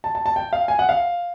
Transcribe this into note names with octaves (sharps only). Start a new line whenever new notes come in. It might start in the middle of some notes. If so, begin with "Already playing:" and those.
A5
A5
A5
G5
F5
G#5
F#5
F5